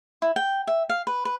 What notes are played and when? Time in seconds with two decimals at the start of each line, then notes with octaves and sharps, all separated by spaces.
0.22 E4
0.36 G5
0.67 E5
0.89 F5
1.07 B4
1.25 B4